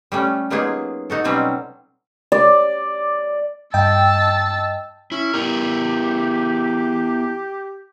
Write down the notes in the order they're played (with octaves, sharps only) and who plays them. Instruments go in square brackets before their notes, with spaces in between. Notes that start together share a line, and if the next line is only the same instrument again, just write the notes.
[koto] G3 A3 C#4
F#3 A#3 B3 D#4 F4 G#4
D#4 F#4 A4
B2 F#3 G3 C4 C#4
[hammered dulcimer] D5
[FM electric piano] G2 D#5 G5 [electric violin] A5 E6
[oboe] C#4 [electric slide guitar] E4
[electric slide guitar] B3 E4 A#4 [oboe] G4